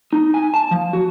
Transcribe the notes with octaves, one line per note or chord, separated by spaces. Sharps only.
D#4
G#5
A5
F3
F#4